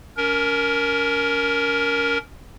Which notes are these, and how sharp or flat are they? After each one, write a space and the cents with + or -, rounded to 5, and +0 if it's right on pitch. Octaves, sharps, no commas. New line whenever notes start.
C#4 +35 A#4 +0